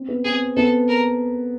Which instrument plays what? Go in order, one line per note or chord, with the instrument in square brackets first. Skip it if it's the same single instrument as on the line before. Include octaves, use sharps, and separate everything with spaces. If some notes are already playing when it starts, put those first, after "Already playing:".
Already playing: [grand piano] C4
B3
[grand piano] C4 [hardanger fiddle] G#4
[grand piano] B3 [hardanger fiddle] A4
[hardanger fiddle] A#4